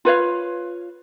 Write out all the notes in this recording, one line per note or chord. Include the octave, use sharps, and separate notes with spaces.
F4 B4 C#5 F5